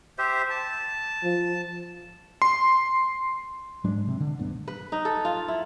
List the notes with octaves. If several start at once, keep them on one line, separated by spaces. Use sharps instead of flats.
G4 C5 E5
A5
F3
C6
G#2 F#3 G#3 D4
C3
D3
D#1 D2 G2 B3
B4
D#4
A4
F4
E4